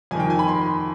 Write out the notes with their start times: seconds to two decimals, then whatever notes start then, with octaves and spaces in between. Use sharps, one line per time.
0.11 F2 G#5
0.15 D#3 G5
0.30 G#5
0.39 B5
0.48 C6